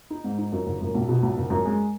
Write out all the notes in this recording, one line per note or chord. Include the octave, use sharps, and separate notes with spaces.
D#4
G#2
D#4
F#2
F#1
F#2
B1
B2
B1
F#1
F#2
G#3